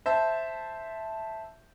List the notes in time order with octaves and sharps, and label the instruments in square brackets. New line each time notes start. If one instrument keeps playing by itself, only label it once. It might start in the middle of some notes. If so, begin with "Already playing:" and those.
[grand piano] C5 E5 A5